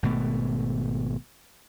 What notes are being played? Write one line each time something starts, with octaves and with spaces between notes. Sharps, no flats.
G#1 B2 A3